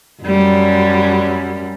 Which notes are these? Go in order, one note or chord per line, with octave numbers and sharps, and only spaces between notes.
F#2 G3